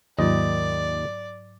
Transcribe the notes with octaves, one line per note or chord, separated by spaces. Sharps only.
D#2 G#2 D#3 F#3 F4 D5 D#5